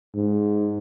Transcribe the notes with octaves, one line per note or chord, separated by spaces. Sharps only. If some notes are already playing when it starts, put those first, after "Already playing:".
G#2